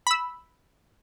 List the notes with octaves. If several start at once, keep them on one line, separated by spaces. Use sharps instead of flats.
B5 E6